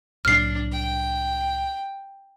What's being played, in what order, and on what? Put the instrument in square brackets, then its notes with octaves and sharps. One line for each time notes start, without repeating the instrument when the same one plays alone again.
[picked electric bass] C2 A2 F#3 [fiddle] D4 [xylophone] F6 C7
[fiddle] G5